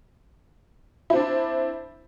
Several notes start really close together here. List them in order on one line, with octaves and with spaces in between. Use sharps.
E4 C4 D4